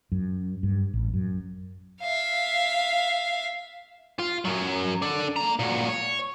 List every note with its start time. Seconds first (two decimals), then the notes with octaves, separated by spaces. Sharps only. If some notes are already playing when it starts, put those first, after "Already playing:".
0.12 F#2
0.63 G2
0.94 A1
1.14 F#2
2.01 E5 F5
4.19 F4
4.45 F#2 F#3
5.02 D4 A4
5.36 A#3 A#5
5.59 A#2 F#4
5.89 C#5